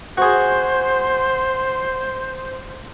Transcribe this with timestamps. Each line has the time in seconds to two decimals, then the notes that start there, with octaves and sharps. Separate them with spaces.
0.17 F#4 G#4 C5